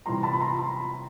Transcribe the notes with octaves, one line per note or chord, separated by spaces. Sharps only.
C3 E3 G3 A#5 C6
A5 B5
B5
A#5 C6
A#5 C6